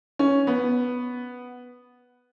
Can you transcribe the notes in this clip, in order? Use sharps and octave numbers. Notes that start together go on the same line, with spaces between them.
C#4
B3